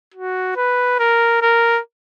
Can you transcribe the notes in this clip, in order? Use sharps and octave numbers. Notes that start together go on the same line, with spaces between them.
F#4
B4
A#4
A#4